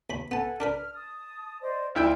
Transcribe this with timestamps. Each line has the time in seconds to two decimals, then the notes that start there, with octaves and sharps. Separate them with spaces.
0.10 D#2 B5
0.31 B3 A4 F#5 G#5 A5
0.60 D4 A#4 B4 F6
0.93 A5 D#6
1.62 C5 D5 D#5
1.95 D2 E4 F4 G5